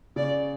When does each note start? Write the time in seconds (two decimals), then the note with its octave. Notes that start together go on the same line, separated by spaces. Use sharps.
0.16 C#3 D5